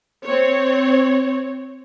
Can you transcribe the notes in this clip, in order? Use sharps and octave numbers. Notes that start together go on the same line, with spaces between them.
C4 C#5